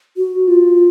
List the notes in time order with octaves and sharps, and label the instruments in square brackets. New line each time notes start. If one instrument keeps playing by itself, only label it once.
[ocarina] F#4
F4